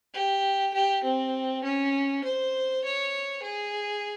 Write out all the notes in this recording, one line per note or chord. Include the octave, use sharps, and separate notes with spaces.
G4
G4
C4
C#4
C5
C#5
G#4